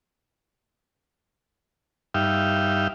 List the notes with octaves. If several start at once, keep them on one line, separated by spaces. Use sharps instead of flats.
G2 D#4 E5 F5 G5